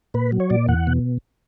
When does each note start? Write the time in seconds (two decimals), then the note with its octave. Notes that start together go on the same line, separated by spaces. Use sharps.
0.14 A#2 B4
0.32 F#3
0.40 C#5
0.50 A#2 D5
0.68 E2 F#5
0.87 B2